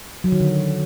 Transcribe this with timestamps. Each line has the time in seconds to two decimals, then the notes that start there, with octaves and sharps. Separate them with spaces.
0.24 F#3
0.32 D#3
0.40 D3